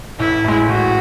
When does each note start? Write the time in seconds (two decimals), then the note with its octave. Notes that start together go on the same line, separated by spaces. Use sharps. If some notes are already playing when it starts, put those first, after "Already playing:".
0.19 A1 E4
0.44 A2 G#3
0.69 A1 F#4